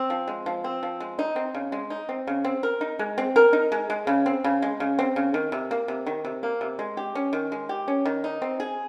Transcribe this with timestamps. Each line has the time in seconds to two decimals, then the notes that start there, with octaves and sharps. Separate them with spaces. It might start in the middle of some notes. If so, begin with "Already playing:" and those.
Already playing: C4
0.10 F3
0.28 G#3
0.46 F3
0.64 C4
0.83 F3
1.00 G#3
1.19 D#4
1.36 C4
1.55 C#3
1.72 G#3
1.90 D#4
2.09 C4
2.27 C#3
2.44 C4
2.63 A#4
2.81 D#4
2.99 G#3
3.18 C4
3.36 A#4
3.53 D#4
3.72 G#3
3.90 G#3
4.07 C#3
4.26 C4
4.44 C#3
4.62 G#3
4.80 C#3
4.99 C4
5.16 C#3
5.34 D#3
5.52 C3
5.71 A#3
5.88 C3
6.06 D#3
6.25 C3
6.43 A#3
6.61 C3
6.79 G#3
6.97 G4
7.15 C#4
7.33 D#3
7.52 G#3
7.69 G4
7.88 C#4
8.05 D#3
8.24 D#4
8.42 C4
8.60 G#4